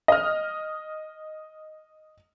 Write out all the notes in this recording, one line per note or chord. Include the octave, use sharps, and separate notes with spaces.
D#5 F6